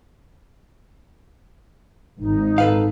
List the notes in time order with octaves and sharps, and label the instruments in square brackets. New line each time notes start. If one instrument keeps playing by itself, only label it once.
[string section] G#1 [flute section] D#4
[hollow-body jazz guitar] A4 B4 F5